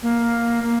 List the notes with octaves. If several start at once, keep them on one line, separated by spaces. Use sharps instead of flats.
A#3
A#3